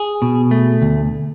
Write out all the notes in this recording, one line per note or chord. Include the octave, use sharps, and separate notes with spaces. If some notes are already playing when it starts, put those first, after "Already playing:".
Already playing: G#4
B2
A3
D2